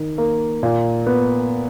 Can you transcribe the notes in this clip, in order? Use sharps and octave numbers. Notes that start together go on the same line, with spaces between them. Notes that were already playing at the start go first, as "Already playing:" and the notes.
Already playing: D#3
A#3
A#2
B3